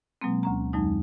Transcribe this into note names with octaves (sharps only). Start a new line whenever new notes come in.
B2 F#3 G#3 A#3 C4
D2 C#4 A#5
F2 D#3 F#3 G#3 D#4